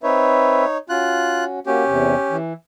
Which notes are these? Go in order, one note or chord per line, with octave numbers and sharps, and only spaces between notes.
C4 D#4 B4 C#5 E5
C#4 F4 F#4 F#6
A#3 C#4 F#4 G4
E2 C3
E3